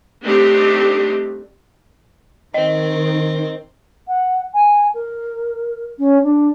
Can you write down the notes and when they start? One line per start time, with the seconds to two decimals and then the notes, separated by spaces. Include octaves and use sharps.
0.25 G3 A3 C4 D4 D#4 G4
2.54 D#3 C4 D#5
4.08 F#5
4.54 G#5
4.94 A#4
5.98 C#4
6.23 D4